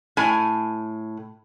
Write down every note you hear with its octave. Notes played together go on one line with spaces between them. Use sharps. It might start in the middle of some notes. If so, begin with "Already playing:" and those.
A2 G#5